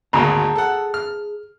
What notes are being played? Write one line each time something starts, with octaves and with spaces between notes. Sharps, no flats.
G#1 D2 A#2 G#4 A5 A#5
A4 F#5
F6